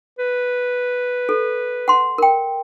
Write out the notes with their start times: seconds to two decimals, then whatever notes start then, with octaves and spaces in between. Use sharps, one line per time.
0.19 B4
1.29 A4
1.88 F#5 C6
2.18 A#4 G5